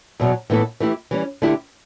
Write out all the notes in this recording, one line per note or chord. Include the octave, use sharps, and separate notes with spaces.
E2 B2 F#3
A2 E3 B3 E4 A4
E3 A3 E4 G4
E3 G3 C#4
D3 A3 E4 G4